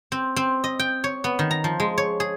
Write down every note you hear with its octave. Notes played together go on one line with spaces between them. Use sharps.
C4
C4
D#5
G5
C#5
B3
D#3
A#5
F3
G#3
C#5
G#4